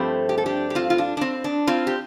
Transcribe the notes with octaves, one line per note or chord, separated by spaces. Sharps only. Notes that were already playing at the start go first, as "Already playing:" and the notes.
Already playing: G2 F3 A3 C4 G4 C5
G4
A4
D4 G4
G4
C4 F4
F4
D4
D4
C4
D4
C4 F4
G4